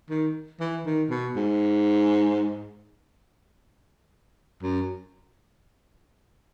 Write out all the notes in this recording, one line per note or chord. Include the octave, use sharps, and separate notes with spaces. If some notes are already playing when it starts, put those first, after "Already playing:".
D#3
E3
D#3
B2
G#2
F#2